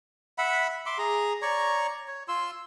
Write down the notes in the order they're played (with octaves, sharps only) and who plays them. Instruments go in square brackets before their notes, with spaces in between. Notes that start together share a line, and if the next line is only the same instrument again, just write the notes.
[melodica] E5 F#5 B5
E5 C6 D6
G#4 A#5
C#5 D5 A#5 C#6
C#5
F4 C6 E6